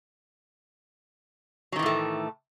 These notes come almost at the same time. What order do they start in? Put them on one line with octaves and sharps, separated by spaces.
F#3 D#3 E3 A2 A3